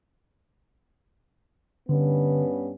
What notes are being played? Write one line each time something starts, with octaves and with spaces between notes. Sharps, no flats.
G2 D3 B3 C#4